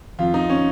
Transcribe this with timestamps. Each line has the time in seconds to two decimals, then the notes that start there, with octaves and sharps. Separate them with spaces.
0.19 F2 F4
0.34 D#4
0.50 C#4